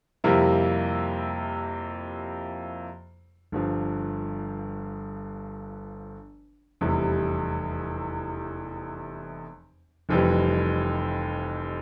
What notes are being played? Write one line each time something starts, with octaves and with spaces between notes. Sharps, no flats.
F2 C3 G3 A#3 E4
G1 G2 F3
F1 E2 C3 G3
F1 F2 E3 G3